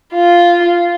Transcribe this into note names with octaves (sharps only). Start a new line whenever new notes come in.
F4